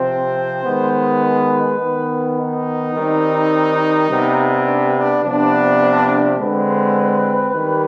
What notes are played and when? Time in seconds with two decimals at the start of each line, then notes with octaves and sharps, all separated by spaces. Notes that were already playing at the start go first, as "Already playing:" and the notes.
Already playing: C3 F3 C4 C5
0.65 D#3 G#3 B3
1.21 B4
1.79 D#3 B3
2.37 D#4
2.95 D#3 G3 C4
4.09 C3 G3 B3
4.67 D4
4.96 D4
5.23 C3 F3 B3 D4
6.38 D3 G#3 C4 B4
7.54 D#3 G3